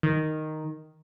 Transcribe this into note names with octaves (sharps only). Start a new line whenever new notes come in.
D#3